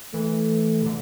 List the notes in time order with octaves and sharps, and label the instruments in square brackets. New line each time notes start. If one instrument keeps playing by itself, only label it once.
[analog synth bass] E3 [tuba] A3
[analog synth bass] C3
D3